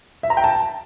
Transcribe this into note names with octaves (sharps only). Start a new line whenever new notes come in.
E5
A#5
G5
A5